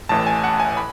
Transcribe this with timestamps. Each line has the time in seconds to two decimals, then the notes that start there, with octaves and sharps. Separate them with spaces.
0.09 A1 A2 E3 A5
0.26 G#5
0.44 F#5
0.60 G#5
0.77 B5